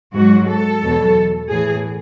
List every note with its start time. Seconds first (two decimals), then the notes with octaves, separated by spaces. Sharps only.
0.16 G#2 F#3 F#4
0.49 A4
0.82 E2 B2 F#3
1.48 A2 E3 G#4